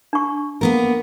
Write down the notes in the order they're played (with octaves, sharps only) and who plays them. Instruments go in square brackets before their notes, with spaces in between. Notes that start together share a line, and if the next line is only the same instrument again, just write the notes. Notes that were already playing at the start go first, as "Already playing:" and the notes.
[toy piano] D4 C#6
[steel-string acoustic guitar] A#3 B3 A#4